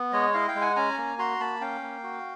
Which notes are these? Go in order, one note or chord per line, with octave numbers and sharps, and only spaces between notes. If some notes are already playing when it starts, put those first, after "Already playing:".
Already playing: B3
G#3 C#5 D#5
E4 D#5 F5
F5 G5
G#3
F#5 G#5
C#4 G#5 A#5
A#3
F#4 A#5 C6
A#3 A5 B5
C#4 F5 G5
A#3
F#4